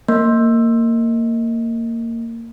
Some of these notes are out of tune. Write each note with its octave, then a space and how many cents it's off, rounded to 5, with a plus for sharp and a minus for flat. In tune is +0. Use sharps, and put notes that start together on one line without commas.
A#3 -20